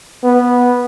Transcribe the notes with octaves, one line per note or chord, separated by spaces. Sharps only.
B3